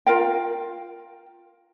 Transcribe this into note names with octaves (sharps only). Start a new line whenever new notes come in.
F4 A#4 F5 G5